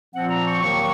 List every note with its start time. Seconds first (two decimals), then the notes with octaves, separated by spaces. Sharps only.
0.14 A#2 F3 C4 F#5
0.29 A#5
0.45 C#6
0.61 D#2 D#3 F#3 A#3 C#6